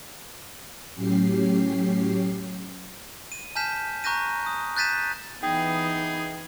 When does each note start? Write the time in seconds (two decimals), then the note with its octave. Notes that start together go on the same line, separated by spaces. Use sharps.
0.95 A2 F#3 C#4 G4 C7
3.32 D#7
3.55 G#5 A5 F6 G6 B6 E7
4.04 A#5 C#6 F#6 G6 A#6 D#7
4.46 D#6
4.76 F#6 G6 A6 B6 D#7 E7
5.43 E3 B3 D#4 G#4 G5